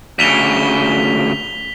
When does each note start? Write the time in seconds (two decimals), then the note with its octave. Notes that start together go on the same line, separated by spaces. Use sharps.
0.19 D2 C#3 B6 F7 G7